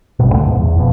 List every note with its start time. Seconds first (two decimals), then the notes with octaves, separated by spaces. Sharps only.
0.19 A1 G2 B2
0.32 C#2 A#2 D3 A3
0.45 D1 A#1 G#2 B2
0.59 E2
0.75 E1 F2 B2